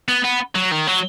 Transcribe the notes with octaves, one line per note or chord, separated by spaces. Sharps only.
B3
B3
F#3
D#3
F#3